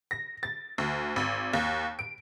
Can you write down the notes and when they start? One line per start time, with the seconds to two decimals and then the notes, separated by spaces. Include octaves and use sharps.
0.11 A#6
0.43 A6
0.78 D2
1.16 G#1
1.54 D#2
1.99 D7